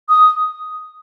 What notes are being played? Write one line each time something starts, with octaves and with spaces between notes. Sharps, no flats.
D#6